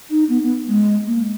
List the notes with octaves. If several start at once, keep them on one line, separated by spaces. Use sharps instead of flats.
D#4
B3
B3
G#3
A#3